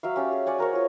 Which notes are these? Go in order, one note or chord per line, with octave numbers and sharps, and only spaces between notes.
F#3 E5 F5
C#4 G4 D5
G#4
D5 F#5 G#5
F#4 A#4 C5 C#5
F4 G#4